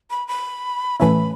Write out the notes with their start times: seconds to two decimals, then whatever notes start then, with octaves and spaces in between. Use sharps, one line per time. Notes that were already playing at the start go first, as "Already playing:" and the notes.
0.11 B5
0.28 B5
1.00 A2 E3 A3 C#4 E4 B5